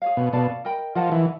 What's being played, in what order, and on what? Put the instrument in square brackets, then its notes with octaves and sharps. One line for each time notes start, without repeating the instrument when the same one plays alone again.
[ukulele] G#4 C#5 F5
[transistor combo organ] B2
[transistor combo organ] B2 [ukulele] A4 D5 F5 A5
[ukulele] A#4 D#5 G5 B5
[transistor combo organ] F3 [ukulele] A#4 D#5 F#5 A5
[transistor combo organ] E3